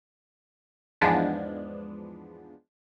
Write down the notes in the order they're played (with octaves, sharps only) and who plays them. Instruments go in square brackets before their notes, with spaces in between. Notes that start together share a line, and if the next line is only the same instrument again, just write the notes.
[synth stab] E2 G#2 F3 G#3 B3 D4